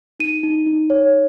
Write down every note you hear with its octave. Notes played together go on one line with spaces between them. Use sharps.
D#4 D#7
D#4
D#4
C#5